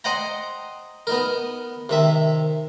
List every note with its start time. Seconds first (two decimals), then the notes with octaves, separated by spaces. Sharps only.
0.04 C5 D#5 F#5 G5 A#5
1.07 B3 D#4 A#4
1.89 C3 D#3 E5